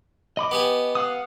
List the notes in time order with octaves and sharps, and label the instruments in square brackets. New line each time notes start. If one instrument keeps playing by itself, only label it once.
[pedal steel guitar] D#5 B5 D6
[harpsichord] B3 G4 G#5
[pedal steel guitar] F5 F#5 D#6